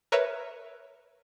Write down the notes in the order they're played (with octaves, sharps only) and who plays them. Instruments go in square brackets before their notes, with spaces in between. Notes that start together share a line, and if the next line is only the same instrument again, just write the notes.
[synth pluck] A#4 B4 C#5 E5